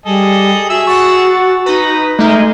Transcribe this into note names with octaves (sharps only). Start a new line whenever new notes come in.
G3 G#4 A4 D#5
F#4 G#4 E5 E6
F#5 C#6 A6
D#4 B4 A#5
G#3 A3 D#4 A#4 E5